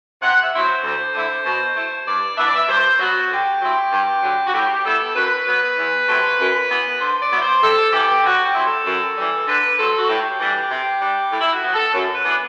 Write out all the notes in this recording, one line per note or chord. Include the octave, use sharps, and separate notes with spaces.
C3 F#5
E5
F#3 C4 E4
C5
D2
D3 A3 E4
B2
A3 E4
G2 D5
E3 B3 D4 E5
D5
E5
G2 C5
F#3 B3 F#4
D3 G4
F#3 C4 E4
G2
D3 F#3
F#4
A2 G4
G3 B3 E4 A4
F#2 B4
F#3 B3 B4
E2
C3 F#3 A3 C4
F#2
E3 B3
D3 C5
D5
F#3 B3 E4
C5
C3 A4
E3 B3 G4
D3 F#4
G4
F#3 C4 E4
A4
F#2
E3 G3
D3 B4
F#3 C4 A4
F#4
A2 G4
E3 G3 D4
C3
G3 D4
A2
E4
F#4
F#3 B3
A4
F#2
B4
E3 B3 D4